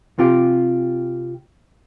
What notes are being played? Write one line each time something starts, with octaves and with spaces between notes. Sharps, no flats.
C3 F4 G4